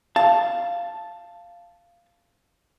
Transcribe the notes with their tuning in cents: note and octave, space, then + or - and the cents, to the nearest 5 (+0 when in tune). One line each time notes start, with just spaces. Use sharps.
F5 -10 A5 +0